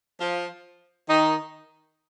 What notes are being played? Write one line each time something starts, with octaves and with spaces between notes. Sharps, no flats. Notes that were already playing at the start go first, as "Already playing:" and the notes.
F3 F4
D#3 D#4